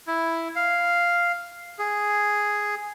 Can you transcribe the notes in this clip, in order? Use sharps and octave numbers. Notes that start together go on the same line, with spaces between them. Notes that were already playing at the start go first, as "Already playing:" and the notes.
E4
F5
G#4